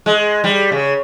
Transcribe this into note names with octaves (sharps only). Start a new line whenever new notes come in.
G#3
G3
C#3